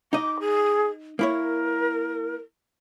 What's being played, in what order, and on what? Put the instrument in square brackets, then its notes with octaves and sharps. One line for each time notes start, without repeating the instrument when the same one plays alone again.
[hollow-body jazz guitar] D#4 D#5 [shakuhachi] D6
[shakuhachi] G#4
[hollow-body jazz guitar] A#3 E4 C#5 [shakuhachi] A#4